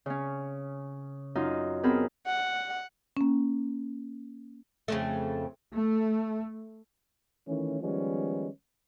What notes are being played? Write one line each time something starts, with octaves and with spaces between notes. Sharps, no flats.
C#3 C#4
F#2 D#4 F4
B3 C4 G#4 A#4 B5
F#5
A#3 C#4
F2 C#3 A3
A3
D#3 E3 A3 C#4
D#3 F3 G3 G#3 B3 C#4